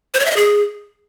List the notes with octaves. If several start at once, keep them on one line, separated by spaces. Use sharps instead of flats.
C5
C#5
E5
D#5
G#4